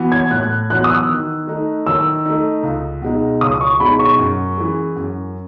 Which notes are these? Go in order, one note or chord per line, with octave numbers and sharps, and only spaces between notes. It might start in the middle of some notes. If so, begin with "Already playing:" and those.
Already playing: E3 B3 F#4
G#6
A2 F#6
E3 B3 F#4 F#6
D#6
E6
D#3
A3 D#4
D#3 E6
A3 D#4
C#2
B2 G#3 D#4
C#2 D#6
C#6
B2 G#3 D#4 B5
C#6
F#2
E3 G#3
F#2